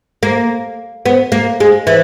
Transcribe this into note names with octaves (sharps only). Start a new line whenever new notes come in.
A#3
B3
A#3
G#3
E3